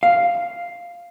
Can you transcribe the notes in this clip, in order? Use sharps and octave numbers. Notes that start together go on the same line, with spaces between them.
F5